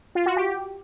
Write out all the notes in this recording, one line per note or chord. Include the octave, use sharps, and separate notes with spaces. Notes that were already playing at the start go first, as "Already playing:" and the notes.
F4
F#4
G4